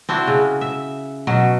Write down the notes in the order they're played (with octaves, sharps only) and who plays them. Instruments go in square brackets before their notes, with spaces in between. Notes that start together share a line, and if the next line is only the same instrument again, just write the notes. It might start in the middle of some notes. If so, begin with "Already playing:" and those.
[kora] C4 D4 E4 F#4
C#3
E5
B2 F#3